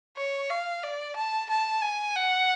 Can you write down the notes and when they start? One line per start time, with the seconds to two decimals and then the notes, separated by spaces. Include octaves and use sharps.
0.17 C#5
0.50 F5
0.83 D5
1.16 A5
1.50 A5
1.82 G#5
2.16 F#5